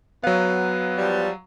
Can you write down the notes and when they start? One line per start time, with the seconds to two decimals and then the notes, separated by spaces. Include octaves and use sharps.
0.24 F#3 B3 F5
0.97 F3 G3